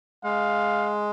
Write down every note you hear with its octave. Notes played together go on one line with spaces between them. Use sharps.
G#3 F5